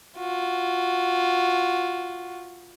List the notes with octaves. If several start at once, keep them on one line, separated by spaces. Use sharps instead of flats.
F4 F#4